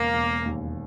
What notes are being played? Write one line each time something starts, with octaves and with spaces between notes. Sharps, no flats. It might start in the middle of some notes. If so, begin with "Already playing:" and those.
Already playing: E1 C#3 A#3
E1
D#2